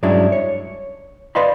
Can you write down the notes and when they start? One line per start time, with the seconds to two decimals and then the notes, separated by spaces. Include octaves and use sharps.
0.03 G2 F#3 G#3 C#4 D4 E4
0.32 C#5
1.35 B4 D5 D#5 F5 B5 C6